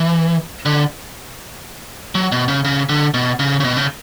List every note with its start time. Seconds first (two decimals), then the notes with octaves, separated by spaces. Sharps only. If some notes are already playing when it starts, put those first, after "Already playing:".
Already playing: E3
0.66 D3
2.15 F#3
2.32 B2
2.48 C#3
2.65 C#3
2.89 D3
3.14 B2
3.40 C#3
3.60 C#3
3.64 B2
3.77 C#3